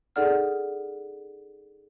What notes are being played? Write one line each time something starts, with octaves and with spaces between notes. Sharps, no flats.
D#4 G#4 A4 D5 F#5 F6